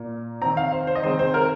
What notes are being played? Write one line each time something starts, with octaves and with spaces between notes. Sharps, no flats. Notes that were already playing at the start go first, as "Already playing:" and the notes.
Already playing: A#2 A#3
D#3 C4 A#5
F5
C5
C5
D#5
D#3 G#3 C4 C5
C5
A#4